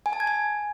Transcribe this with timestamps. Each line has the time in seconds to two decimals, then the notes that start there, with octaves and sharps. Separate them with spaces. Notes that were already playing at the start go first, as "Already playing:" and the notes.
0.06 G#5
0.13 A5
0.20 G#6
0.27 G#5